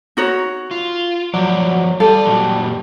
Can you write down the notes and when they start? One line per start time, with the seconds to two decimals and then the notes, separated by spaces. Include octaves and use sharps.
0.17 D#4 F#4 C#5
0.71 F4
1.34 G2 F3 F#3 D5
2.00 G3 A4 F5 A5
2.26 F#2 A#2 F#3